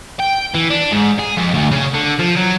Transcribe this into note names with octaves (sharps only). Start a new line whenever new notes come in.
G5
E3
D4
G#2
G#4
F2
D2
C#3
D3
F3
F#3